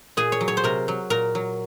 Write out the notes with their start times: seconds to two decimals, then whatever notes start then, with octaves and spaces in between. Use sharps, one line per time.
0.17 A#2 G#4
0.32 C#5
0.41 F#3
0.48 C#5
0.57 C5
0.64 C3 A#4
0.88 F#3
1.10 A#2 A#4
1.35 F#3